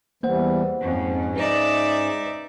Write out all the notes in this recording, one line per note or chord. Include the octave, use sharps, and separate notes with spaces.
E2 E3 G3 A#3 C5 F#5
F2 G#2 C#4
D#4 B4 D5 E5